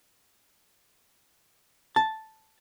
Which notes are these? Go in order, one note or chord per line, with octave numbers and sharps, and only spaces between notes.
A5